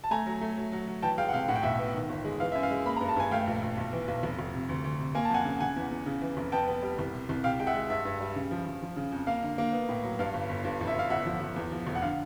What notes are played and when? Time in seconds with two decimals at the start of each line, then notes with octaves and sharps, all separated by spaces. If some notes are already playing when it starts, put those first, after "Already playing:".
0.04 A5
0.11 A3 G#5 A#5
0.26 F#3
0.41 A3
0.57 F#3
0.72 F#3
0.87 F#3
1.02 E3 G5 A5
1.18 G#3 F5 G5
1.29 F#5
1.33 C3 F5 G5
1.48 A2 F#5
1.56 G5
1.62 B1 E5 F#5
1.79 B3
1.94 D#3
2.09 G1
2.25 G#3
2.40 E3 F5
2.52 F#2 E5
2.63 F5
2.71 G#3
2.86 A#3 B5
2.97 G2 A#5
3.09 A5
3.16 G2 G#5
3.31 A3 F5 G5
3.47 A#1
3.62 A#1
3.78 B1
3.93 E3
4.08 B1
4.23 F1
4.39 F1
4.54 C3
4.69 D2
4.84 D2
5.00 C3
5.15 A#3 G#5
5.25 A5
5.30 F2 F#5 G#5
5.45 C#3
5.60 C#3 F#5 G#5
5.76 E2
5.91 E2
6.06 C#3
6.22 E3
6.37 F1
6.52 B3 G5 A5
6.68 B3
6.83 G3
6.99 C2
7.14 C3
7.29 C2
7.44 C3 F5 G5
7.59 G#3 G5
7.67 E5 F#5
7.74 G#3
7.90 G2 E5
8.05 G2
8.20 G3
8.36 C#3
8.51 F3
8.66 F3
8.82 F3
8.96 C#3
9.12 F2
9.27 A#3 F5
9.43 D3
9.58 A#3
9.73 B3
9.89 A2
10.04 F#3
10.19 G2 F5
10.34 G1
10.49 G1
10.65 G2
10.81 A1
10.87 E5
10.95 A1 F5
11.10 G1 E5 F#5
11.26 F3
11.41 F3
11.56 E2
11.71 F3
11.87 F1
11.95 F#5
12.02 D3 F5